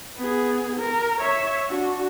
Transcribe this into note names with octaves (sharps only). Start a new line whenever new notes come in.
B3 G#4
A#4
C#5 E5
D4 F#4